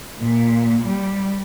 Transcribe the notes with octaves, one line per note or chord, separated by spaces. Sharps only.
A#2
G3